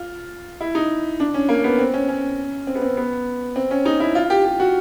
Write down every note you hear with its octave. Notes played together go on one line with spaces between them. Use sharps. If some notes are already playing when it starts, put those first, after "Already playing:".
Already playing: F4
E4
D#4
D4
C#4
A#3
B3
C4
C#4
C#4
C4
B3
C4
B3
C4
C#4
D#4
E4
F4
G4
G4
F#4